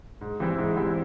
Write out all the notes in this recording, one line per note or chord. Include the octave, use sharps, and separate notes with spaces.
G#2
E3 G3 C4 E4
G#2
E3 G3 C4 E4